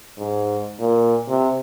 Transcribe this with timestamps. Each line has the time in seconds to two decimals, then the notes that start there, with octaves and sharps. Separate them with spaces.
0.17 G#2
0.79 A#2
1.28 C3